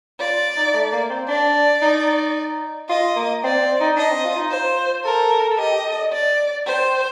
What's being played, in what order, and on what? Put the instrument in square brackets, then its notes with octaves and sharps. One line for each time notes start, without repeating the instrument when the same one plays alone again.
[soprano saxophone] F4 [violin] D5
[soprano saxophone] D#4
A3
A#3
C4
[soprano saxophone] D4 [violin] D5
[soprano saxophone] D#4
[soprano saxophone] F4 [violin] D#5
[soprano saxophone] A#3
[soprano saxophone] C4 [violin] D5
[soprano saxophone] C4
D#4
[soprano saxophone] D4 [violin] D#5
[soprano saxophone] C4
F4
D#4
[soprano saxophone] F4 [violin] C5
[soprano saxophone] A4 [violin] A#4
[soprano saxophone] A4
[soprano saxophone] G4 [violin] D#5
[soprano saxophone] G4
A4
D5
[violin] D5
[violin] C5 [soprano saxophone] G5
[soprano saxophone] G5